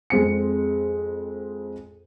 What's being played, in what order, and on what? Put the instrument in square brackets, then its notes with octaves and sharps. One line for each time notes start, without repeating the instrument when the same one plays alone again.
[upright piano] F2 G#3 C4 C#7